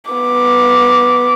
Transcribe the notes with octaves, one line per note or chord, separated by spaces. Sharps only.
B3 D6